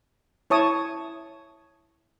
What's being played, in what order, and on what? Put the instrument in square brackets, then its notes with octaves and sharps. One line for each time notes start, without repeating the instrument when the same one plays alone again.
[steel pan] E4 C#5 A5 D#6